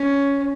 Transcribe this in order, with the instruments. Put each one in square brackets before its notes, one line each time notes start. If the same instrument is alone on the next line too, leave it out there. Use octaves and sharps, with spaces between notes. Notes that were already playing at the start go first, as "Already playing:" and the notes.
Already playing: [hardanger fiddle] C#4